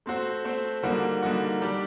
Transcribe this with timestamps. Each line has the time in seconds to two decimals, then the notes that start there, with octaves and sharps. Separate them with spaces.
0.06 A3 C4 F#4 C5
0.45 A3 C4 F#4 C5
0.83 D3 G3 A#3 D#4 F#4
1.23 D3 G3 A#3 D#4 F#4
1.61 G3 D4 G4 D5